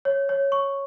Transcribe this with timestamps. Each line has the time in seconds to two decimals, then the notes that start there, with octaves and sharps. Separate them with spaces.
0.05 C#5
0.29 C#5
0.52 C#6